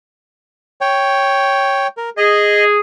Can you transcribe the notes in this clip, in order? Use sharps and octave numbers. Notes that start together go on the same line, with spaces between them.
C#5 G5
A#4
G#4 D#5